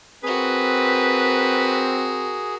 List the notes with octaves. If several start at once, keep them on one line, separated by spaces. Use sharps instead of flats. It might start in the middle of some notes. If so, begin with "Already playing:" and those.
C4 F#4 G#4 A#4 B4